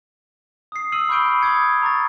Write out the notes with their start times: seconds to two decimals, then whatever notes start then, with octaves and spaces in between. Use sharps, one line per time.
0.72 D#6 C7
0.92 D#6 E6 C7 D#7 F#7
1.09 B5 C#6 F6 G6 D7 G7
1.26 B5
1.42 D6 D#6 G6 G#6 C#7
1.82 A#5 C#6 A6